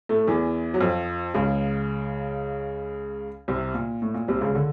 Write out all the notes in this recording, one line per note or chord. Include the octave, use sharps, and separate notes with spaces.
A2 A3
E2 E3
F#3
F2 F3
C#2 C#3
C2 C3
A#2
A2
A#2
C2 C3
C#2 C#3
D3